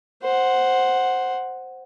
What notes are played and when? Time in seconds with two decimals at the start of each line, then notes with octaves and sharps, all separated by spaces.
0.22 C5 F#5